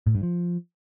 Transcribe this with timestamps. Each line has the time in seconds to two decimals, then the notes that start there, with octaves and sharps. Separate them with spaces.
0.07 A2
0.15 G2
0.23 F3